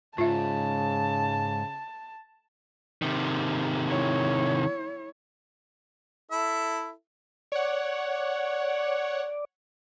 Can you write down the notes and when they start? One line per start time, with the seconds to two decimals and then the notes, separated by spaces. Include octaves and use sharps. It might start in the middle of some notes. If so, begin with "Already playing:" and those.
0.18 G#2 C#3 F4 E5 A5
3.02 C3 D#3
3.90 E4 C#5
6.31 E4 A4 E5
7.52 C#5 D5 F#5